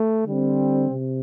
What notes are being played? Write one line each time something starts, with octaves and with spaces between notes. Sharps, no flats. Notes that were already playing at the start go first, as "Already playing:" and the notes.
Already playing: A3
D3 G3 C4
C3